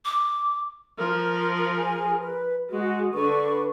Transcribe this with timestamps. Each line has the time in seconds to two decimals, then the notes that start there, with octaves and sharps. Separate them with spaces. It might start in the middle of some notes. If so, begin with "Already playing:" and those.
0.05 D6
0.98 F3 A#4
1.77 G#4 G#5
2.20 B4
2.70 G#3 F#4 G#4
3.14 D3 D4 B4 C#6